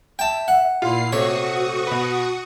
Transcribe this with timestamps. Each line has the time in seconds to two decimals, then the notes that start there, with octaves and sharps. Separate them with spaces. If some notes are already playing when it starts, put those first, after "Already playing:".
0.19 E5 G5 A5
0.48 F#5
0.82 A#2 E4 F4 F5 C6 C7
1.12 C3 A3 F#4 C5 C#5 C#6 D#6
1.87 B2 B4